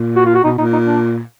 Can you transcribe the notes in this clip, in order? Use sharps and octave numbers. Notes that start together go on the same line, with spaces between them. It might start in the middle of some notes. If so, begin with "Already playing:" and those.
Already playing: A#2
F#4
F4
F#4
B2 D#4
A#2 D#4
D#4
D4